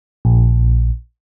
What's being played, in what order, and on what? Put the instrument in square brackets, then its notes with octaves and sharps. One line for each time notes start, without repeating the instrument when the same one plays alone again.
[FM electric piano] A#1